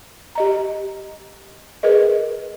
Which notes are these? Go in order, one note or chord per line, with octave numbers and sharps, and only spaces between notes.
G4 D#5 A#5
G#4 A#4 B4 D#5